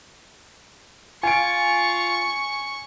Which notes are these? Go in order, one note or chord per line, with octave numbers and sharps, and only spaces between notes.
F4 G#5 C#6 D7